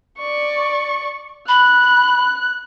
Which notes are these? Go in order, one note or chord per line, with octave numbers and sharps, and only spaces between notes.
D5 C#6
B5 F#6